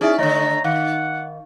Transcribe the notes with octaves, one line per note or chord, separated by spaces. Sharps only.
C#4 D#4 E4 G#4 D5 E5
D3 A3 C#5 D#5 A#5
D#3 F5 F#5